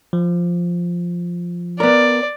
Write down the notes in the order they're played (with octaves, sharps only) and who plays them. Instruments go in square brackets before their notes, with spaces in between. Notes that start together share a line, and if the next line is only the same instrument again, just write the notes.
[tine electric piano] F3
[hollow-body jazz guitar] B3 A#4 [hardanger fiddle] D5